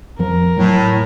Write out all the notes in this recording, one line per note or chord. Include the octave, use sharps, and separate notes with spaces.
F2 F3 A#4
A2 F#3 A3